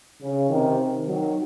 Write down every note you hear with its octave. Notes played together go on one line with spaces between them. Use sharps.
C#3
C3 D#3
D#3 F#3